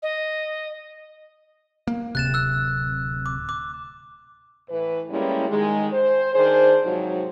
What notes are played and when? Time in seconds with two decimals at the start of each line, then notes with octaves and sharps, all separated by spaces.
0.02 D#5
1.87 A#3
2.15 D1 C3 F#6 A6 E7
2.34 E6 F#6
3.26 D6
3.49 D6
4.69 A2 E3 B4
5.10 G3 G#3 A#3 C#4 E4
5.49 D#3 G#3
5.92 C5
6.34 D#3 D4 G#4 C5
6.84 G#2 C3 F3 F#3 D#4